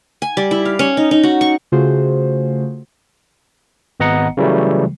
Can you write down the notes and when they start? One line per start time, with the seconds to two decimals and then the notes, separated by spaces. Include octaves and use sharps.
0.22 G#5
0.37 G3
0.51 E4
0.65 F5
0.79 C#4
0.97 D#4
1.11 D#4
1.23 F#4
1.41 C#6
1.72 C#3 A3 F4 F#4 G#4 C5
4.00 G#1 B3 D#5 F#5 A#5 C#7
4.37 C#3 E3 F#3 G3 A3